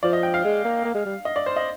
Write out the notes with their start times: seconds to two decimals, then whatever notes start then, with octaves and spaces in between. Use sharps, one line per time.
0.03 F3 D5
0.13 D#5
0.23 G5
0.34 F5
0.45 G#3
0.65 A#3
0.85 A#3
0.95 G#3
1.06 G3
1.25 D#5
1.36 D5
1.46 C5
1.56 D#5